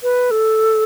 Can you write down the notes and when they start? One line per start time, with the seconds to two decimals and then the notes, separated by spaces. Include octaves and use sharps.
0.03 B4
0.31 A4